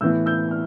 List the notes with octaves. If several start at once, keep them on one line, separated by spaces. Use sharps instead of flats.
A2 E3 B3 E6 G6
E6 G6
F6